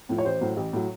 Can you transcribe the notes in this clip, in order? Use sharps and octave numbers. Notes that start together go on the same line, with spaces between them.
A2 F3
C#5
A1 C5
A2 F#3
A1
A2 F#3